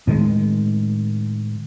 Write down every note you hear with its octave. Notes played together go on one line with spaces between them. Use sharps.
A2 D#3 G#3